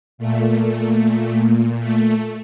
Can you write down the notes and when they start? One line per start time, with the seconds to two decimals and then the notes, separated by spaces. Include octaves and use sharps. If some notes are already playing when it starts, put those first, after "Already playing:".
0.18 A#2 A3
1.79 A3